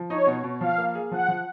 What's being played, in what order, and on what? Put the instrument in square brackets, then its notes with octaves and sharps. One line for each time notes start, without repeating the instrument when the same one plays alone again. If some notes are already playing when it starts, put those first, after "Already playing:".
Already playing: [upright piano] F3
[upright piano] D#4 [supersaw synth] C#5
[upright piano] B2
B2
[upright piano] F3 [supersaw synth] F5
[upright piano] A#3
G#4
[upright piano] F3 [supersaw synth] F#5
[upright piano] F3